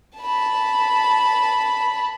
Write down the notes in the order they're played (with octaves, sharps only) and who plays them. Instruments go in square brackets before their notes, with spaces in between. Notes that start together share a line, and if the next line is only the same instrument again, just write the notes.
[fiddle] A5 B5